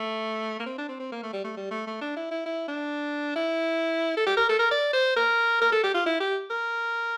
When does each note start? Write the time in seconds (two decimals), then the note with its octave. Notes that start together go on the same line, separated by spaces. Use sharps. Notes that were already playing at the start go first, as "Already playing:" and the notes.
Already playing: A3
0.59 A#3
0.66 C4
0.78 D4
0.89 C4
0.99 C4
1.12 A#3
1.23 A3
1.33 G3
1.44 A3
1.57 G3
1.71 A3
1.87 A3
2.01 D4
2.17 E4
2.31 E4
2.46 E4
2.68 D4
3.36 E4
4.17 A4
4.27 G4
4.37 A#4
4.49 A4
4.59 A#4
4.71 D5
4.93 C5
5.16 A#4
5.61 A#4
5.72 A4
5.83 G4
5.94 F4
6.06 E4
6.20 G4
6.50 A#4